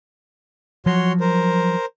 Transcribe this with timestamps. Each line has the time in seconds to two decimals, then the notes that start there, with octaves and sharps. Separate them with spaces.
0.86 F3 F#3 F#4 C#5 C6
1.20 A#4 C5